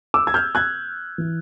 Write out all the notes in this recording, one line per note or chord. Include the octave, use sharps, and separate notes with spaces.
D6 E6
G#6
F6 G6
F#6 G#6
E3